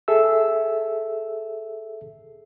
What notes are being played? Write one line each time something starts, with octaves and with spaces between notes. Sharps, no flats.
G#4 A4 E5 E6